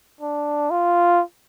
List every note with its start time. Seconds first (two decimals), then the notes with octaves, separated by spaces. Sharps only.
0.21 D4
0.70 F4